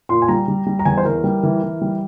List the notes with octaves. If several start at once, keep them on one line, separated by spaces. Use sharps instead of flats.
A#2 C6
G#5
G3 A#5
G3
G3
A#5
E2 G#5
C5
E3 A#4
G3
E3
E3
G3